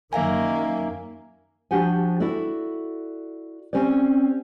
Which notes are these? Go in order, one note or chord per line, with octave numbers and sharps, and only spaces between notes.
F#2 D#3 A#3 E5 F5 G#5
F3 D4 F#4 G4 F#5 G#5
E4 F#4 A4 D5
C4 C#4 G4 C5 D5